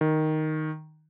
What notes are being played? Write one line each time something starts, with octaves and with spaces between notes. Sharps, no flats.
D#3